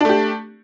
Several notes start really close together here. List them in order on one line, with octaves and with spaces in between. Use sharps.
D4 A3 G4